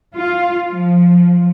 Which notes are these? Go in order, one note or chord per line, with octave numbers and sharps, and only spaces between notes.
F4
F3